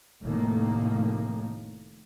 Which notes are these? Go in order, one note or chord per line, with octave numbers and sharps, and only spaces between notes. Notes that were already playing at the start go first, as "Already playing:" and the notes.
F1 A2 D#3 A#3